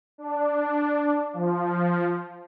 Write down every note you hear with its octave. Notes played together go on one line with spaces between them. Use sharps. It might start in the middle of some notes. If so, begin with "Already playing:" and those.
D4
F3